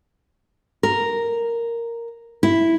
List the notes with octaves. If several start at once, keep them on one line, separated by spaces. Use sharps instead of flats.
A#4
E4